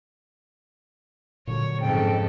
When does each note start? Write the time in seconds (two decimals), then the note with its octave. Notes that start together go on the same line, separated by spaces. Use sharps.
1.47 A#2 D3 F#3 C#5
1.81 F2 G#2 C#3 A4 G5